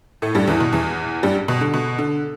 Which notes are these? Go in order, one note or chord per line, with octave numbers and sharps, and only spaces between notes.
A2 A3
G2 G3
E2 E3
B2
E2 E3
G2 G3
B2
D3
B2
D3